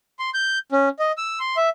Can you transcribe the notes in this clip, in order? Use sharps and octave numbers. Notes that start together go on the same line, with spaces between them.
C6
G6
C#4
D#5
E6
C6
E5